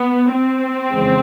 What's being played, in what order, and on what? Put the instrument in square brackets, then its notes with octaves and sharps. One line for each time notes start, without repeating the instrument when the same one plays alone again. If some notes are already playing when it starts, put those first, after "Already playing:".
Already playing: [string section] B3
C4
F2 C#3 E3 G#3